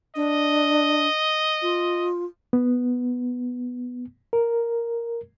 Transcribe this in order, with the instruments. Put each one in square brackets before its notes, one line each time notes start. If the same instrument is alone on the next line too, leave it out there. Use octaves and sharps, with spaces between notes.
[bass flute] D4 [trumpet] D#5
[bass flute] F4
[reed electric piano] B3
A#4